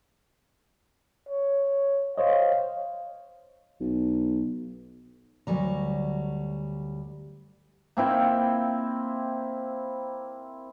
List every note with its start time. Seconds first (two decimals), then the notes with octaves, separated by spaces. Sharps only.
1.29 C#5
2.18 C5 C#5 D#5 F5
3.80 B1
5.47 D2 F#3 G3 A#5
7.97 A#3 C4 E4 G5